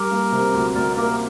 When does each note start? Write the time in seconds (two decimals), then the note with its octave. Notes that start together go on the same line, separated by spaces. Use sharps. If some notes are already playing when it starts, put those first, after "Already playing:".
Already playing: G3 G4 A#4
0.11 A#3
0.32 C3
0.54 D2
0.75 D2 A#4 D5
0.96 A#3 G4 A#4